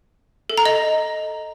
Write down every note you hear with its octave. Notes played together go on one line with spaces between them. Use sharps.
A4
A#5
D#5